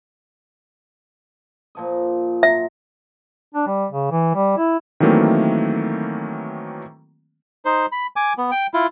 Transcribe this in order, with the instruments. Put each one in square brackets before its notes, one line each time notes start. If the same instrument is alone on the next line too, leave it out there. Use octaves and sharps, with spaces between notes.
[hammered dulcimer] A#2 F3 D#5
[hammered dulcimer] F#3 [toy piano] E5
[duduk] D4
G3
C#3
E3
G3
E4
[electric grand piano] D#3 E3 F#3 A3 A#3 C4
[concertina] D#4 C5
B5
G#5 D6
B3
G5
E4 F4